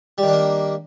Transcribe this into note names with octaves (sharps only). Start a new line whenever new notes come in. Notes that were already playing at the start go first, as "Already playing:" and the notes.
D#3 G3 A#3 D4